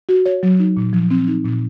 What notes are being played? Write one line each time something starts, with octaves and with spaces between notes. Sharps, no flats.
F#4
C#5
F#3
D#4
A#2
F3
C4
D#4
A#2